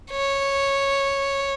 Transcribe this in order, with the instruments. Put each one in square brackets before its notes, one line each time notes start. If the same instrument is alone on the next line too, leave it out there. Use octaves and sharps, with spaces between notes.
[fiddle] C#5